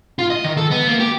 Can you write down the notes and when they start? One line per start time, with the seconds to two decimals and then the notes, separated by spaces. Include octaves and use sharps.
0.19 F4
0.30 D#5
0.44 D#3
0.57 A4
0.71 B3
0.87 A#3
1.00 G4